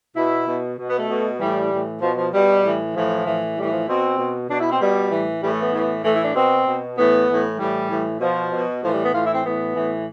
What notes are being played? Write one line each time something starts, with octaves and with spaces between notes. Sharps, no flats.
B2 E4
B2
B2
B3
A3
B2
A2 E3 G3
A2 E3
B2 F3
F3
B2 G3
A2 E3
A2 E3 F3
A2 E3
A2 E3 G3
F3
B2 C4
B2
B2 D4
E4
C4
B2 G3
A2 E3
A2 E3 G3
A3
B3
A2 E3
A2 E3 A3
E4
D4
B2 C4
B2
A2 E3 B3
A2 E3
A2 E3 G3
A2 E3
B2 F3
B2
A2 E3 F3
G3
B3
A2 E3 F4
E4
C4
A2 E3 B3
A2 E3